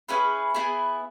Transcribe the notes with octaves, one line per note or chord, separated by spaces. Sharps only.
C#4 E4 G#4 B4
B3 E4 G#4